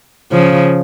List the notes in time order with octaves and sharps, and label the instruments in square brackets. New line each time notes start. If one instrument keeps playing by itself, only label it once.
[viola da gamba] C#3 F3